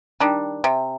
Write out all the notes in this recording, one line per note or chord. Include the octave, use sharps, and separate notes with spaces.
D#3 G3 D4
C3